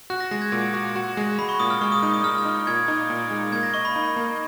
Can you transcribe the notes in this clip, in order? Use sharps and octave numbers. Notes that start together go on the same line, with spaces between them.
F#4 F#6
A#6
G#3 A#6
G#6
A#2
F#4
F#4
G#3
G#3 B5
C#6
A#2 D#6
F6
G#3 C#6
D#6
D#4 D#6
D#6
G#3 F6
F6
D#4
A#2 G#6
D#4
A#2
G#3
A#3 G#6
A#6
D#5 C#6
B5
D#4
A#3